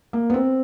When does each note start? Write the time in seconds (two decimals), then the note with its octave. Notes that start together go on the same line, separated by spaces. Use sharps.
0.13 A#3
0.30 B3
0.34 C4